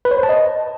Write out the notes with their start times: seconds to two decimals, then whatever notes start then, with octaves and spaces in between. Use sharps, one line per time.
0.05 B4
0.11 C#5
0.17 C5
0.23 A5
0.29 D#5